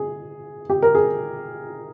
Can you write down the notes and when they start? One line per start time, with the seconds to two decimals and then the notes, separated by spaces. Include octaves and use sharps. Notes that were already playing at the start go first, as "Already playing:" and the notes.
Already playing: G#4
0.70 G4
0.82 A#4
0.95 G#4